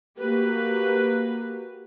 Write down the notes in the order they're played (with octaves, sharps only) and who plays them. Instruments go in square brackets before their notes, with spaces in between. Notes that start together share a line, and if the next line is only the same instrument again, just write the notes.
[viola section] A#3 F#4 G4 B4